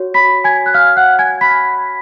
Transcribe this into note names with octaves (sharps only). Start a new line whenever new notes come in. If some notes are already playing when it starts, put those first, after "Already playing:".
Already playing: F#4 C#5
B5 B6
G#5 G#6
F#6
F5 F6
F#5 F#6
G#5 G#6
B5 B6